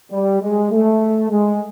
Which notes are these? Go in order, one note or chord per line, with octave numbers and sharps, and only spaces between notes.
G3
G#3
A3
G#3